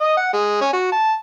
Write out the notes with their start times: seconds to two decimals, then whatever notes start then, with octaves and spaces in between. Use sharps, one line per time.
0.02 D#5
0.17 F#5
0.33 G#3
0.61 C#4
0.73 F#4
0.92 A5